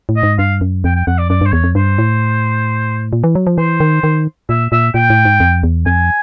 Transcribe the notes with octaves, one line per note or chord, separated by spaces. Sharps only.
A2
D#5
G#2
G2 F5
F#2
F2 G5
G5
F2 F#5
D5
F#2 D5
G2 C5
E2 C#5
F2
G2 C5
A2
A#2
E3
F#3
F3
E3 C5
D#3
D#3
A#2 E5
A#2 E5
A#2 G5
A2
G#2
F2
E2
F2 G#5